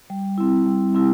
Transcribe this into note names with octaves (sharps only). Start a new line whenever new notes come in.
G3
C4 E4
G3
C4 E4